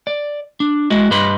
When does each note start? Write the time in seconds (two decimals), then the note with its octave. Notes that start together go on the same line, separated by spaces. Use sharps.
0.07 D5
0.60 D4
0.90 G#3 E4 F#4 D#5
1.11 G2 G4 B4 D#5 B5 C6